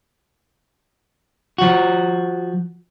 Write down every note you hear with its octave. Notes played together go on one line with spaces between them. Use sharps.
F3 F#4